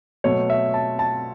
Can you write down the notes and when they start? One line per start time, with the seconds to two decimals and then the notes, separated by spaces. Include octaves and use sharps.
0.24 B2 F#3 A3 C#5
0.50 E5
0.74 A5
0.99 A5